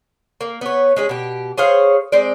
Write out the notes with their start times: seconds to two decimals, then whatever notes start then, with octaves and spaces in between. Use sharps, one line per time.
0.41 A#3
0.61 B3 C#5
0.96 G#3 C#4 G#4
1.09 B2 G4
1.58 G#4 C5 C#5 F5
2.12 G#3 C4 D5